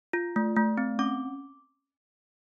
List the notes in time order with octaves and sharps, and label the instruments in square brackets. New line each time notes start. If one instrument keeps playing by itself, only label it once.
[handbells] F4
A3
A3
C4
C#4 D6